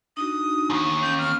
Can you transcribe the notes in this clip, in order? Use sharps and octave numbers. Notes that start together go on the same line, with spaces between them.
D4 D#4 F#4 D#6
D#2 G#2
C#4 G6
C4 F6